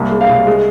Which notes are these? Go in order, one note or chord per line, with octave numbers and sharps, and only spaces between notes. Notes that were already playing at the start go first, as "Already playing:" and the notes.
Already playing: C2 A#3
G#3
F5
C2
G#3